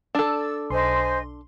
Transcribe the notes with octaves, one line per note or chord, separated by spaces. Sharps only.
D4 A4 E6 A6
B1 C5 D#5 G#5 C6